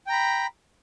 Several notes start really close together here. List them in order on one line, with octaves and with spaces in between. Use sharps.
G5 A#5 B5